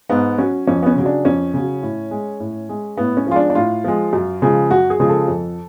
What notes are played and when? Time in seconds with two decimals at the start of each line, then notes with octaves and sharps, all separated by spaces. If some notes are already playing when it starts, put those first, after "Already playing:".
0.10 G#2 B3
0.38 F#3 C#4
0.67 F2 C#4
0.83 B3
0.86 C#4
0.96 C#3 F#3
1.06 D4
1.25 F2 C#4
1.54 C#3 F#3
1.83 A2
2.11 G#3
2.40 A2
2.69 G#3
2.97 A2 B3
3.17 C#4
3.27 F3 G#3 F4
3.36 D4
3.50 D4
3.55 A2 F4
3.84 F3 G#3
4.13 F#2
4.42 C#3 F3 G#3
4.71 F#2 F#4
4.90 G#4
5.00 C#3 F3 G#3
5.09 A4
5.28 F2